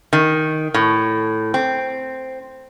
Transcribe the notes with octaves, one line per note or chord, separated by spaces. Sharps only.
D#3
A2
C4